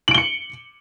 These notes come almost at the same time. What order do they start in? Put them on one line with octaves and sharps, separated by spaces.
F#7 D7 G7 C#7